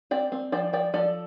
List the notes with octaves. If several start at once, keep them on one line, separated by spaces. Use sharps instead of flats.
C4 D5 G5
C4
F3 D5 G5
F3 D5 G5
F3 A4 D5